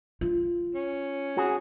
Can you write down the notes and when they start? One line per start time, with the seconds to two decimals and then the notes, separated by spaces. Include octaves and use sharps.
0.21 F4
0.75 C#4
1.37 F#4 G#4